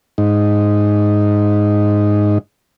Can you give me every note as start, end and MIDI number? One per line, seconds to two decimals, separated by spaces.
0.18 2.38 44
0.18 2.38 63